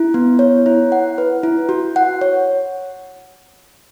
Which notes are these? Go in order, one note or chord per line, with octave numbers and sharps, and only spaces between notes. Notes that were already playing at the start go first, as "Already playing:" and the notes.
Already playing: E4
B3
C#5
E4
F#5
B4
E4
F#4
F#5
C#5